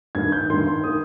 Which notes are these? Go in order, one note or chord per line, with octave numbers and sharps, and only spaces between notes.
G2 D#3 G#6
G6
G2 D#3 C6
C6
D#3 D#6